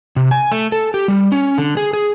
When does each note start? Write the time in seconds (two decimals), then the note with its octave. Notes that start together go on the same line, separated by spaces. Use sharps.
0.16 C3
0.31 G#5
0.52 A3
0.72 A4
0.94 G4
1.08 G3
1.32 C#4
1.58 D3
1.77 G#4
1.93 G#4